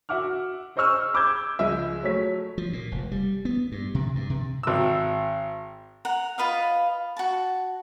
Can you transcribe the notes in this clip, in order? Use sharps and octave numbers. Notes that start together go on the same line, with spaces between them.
F#4 E5 F#5 D6 F6
G#4 C5 D#5 C#6 E6 F6
B5 D6 E6 G6 G#6
C#2 F3 G#3 D#5 E5
F#3 A3 C#5 B6
F3
A#2
F1
G3
B3
G2
C3
G2
C3
G#1 E6
F#5 A#5
F4 B4 D#5 F5
F#4 A5